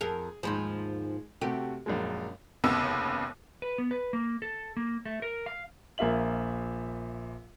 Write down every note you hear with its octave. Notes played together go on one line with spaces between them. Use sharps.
F2 G#4 A#4
D#2 G#2 F3 G#3 B5 C6
C3 A3 F#4 G4
A#1 F#2 G#3
F1 D#2 C#3 B3 E6
B4
B3
B4
A#3
A4
A#3
A3
A#4
F5
A#1 A#3 F4 E5 F#7